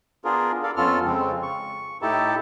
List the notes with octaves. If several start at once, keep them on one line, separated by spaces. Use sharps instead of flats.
B3 D4 F4 G#4 A#4
A4 A#4 D5 F5
F2 B3 C#4 F4 A4 F6
F2 C#3 G#3 C4
C#6
A2 D#4 E4 G4 A4 A5